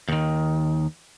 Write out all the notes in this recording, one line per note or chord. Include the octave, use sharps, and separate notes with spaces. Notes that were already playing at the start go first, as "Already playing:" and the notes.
D#2 D#3